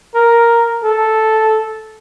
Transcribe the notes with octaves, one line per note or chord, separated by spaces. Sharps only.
A#4
A4